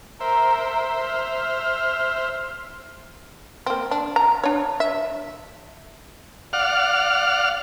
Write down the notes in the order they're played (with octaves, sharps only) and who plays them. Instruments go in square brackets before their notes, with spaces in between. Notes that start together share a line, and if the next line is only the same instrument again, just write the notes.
[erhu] A#4 [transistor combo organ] C5 E5
[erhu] F6
[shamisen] A#3 C4
D4
A#5
D4 C#5
E5
[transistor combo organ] D5 F5 F#5 F6